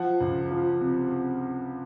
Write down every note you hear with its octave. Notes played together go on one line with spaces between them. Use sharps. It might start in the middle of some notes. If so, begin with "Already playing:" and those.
Already playing: F3 F#5
C#2
F3
C3